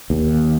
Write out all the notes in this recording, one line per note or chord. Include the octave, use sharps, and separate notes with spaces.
D#2